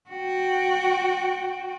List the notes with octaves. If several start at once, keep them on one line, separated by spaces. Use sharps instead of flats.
F#4 G5